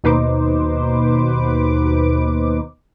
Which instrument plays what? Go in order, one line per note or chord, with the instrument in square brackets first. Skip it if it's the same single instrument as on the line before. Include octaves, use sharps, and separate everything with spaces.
[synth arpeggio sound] D#2 B2 D#4 B4 C5 D6